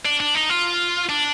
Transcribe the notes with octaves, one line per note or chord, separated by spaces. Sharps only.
D4
D4
D#4
F4
D4